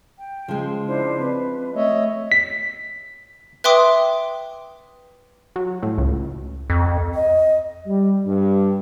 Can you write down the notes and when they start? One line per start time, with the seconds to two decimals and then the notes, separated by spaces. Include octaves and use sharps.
0.18 G5
0.48 C#3 F3 G#3
0.87 D4 E4 C5
1.19 C4 B4
1.76 A3 C#5 D#5 E5
2.32 B6
3.64 B4 E5 G5 C6 D6 D#6
5.56 F#3
5.83 A2
5.98 C#2
6.70 F2
7.14 D#5
7.86 G3
8.26 G2